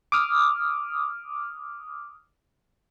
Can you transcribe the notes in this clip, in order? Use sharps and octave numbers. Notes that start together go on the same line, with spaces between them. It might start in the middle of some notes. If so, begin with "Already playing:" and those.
D6 D#6 F6